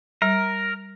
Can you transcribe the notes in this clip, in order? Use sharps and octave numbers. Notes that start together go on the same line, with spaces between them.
G3 A#4